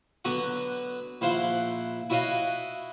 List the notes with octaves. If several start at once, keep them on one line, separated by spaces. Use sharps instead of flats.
D3 F#3 B3 F#4
A#1 E4 C5 F5 F#5 C6
E4 F#4 C#5 D#5 F5